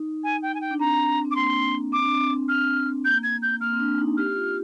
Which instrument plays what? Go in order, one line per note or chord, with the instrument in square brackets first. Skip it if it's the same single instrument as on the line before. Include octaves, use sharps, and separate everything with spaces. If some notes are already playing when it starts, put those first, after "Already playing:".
Already playing: [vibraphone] D#4
[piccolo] G#5
G5
G#5
G5
[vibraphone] D4
[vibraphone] C4 [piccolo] A#5
[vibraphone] C4
[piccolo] D6
[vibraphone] A#3 [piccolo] C6
[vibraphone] C4 [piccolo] D6
[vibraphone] D4
C4
[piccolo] F6
[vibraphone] A#3 [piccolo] G6
[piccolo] G#6
G6
[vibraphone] A#3 [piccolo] F6
[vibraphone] C4
D4
D#4
[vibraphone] G4 [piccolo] F6
[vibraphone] F4